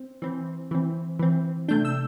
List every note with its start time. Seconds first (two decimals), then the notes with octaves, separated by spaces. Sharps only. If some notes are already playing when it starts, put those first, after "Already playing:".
Already playing: C4
0.22 E3 C4
0.71 E3 C4
1.19 E3 C4
1.68 C3 A3 D4 G6
1.85 E6